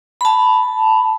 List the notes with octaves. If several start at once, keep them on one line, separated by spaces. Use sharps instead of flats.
A5 B5